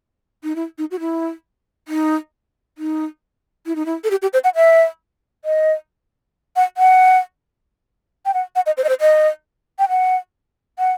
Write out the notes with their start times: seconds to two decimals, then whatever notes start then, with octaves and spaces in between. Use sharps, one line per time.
0.44 D#4
0.56 E4
0.78 D#4
0.91 F#4
1.00 E4
1.88 D#4
2.78 D#4
3.66 E4
3.76 D#4
3.86 E4
4.04 A4
4.11 G4
4.22 G4
4.33 C5
4.44 F#5
4.56 E5
5.45 D#5
6.56 F#5
6.77 F#5
8.26 G5
8.34 F#5
8.56 F#5
8.66 D#5
8.77 C5
8.84 D#5
8.89 C5
9.01 D#5
9.79 G5
9.89 F#5
10.79 F#5